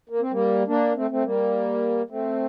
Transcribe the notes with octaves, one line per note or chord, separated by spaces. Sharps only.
A#3
C4
G3 A#3
A#3 D4
A3 C4
A3 C4
G3 A#3
A3 C4